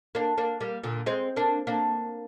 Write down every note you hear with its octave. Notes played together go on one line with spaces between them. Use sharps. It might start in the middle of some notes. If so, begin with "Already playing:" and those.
A#3 D4
A#3 D4
G3 A#3
A#2 D3
G#3 C4
A#3 D4
A#3 D4